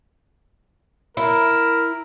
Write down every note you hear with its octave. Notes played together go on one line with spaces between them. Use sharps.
E4 A#4